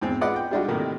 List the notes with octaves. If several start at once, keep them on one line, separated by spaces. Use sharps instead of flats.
E2 G#2 C4
G#3 F4 B4 D5 D#5 F#5
G5
G3 G#3 D4 D#4 F4 F#4
A2 C3 D#3 A3 A#3